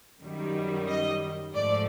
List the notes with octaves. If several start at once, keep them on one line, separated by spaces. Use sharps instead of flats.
F#2 D#3 G3
D#5
G#2 F3 A3 D5